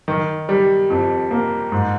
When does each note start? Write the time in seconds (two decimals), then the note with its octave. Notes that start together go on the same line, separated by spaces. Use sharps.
0.08 D#3
0.49 G3
0.90 F2
1.31 A#3
1.72 G#2